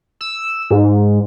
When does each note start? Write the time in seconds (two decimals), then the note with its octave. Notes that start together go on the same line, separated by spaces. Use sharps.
0.21 E6
0.70 G#2